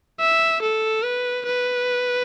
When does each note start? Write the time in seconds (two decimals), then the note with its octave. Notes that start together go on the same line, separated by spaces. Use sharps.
0.20 E5
0.62 A4
1.04 B4
1.46 B4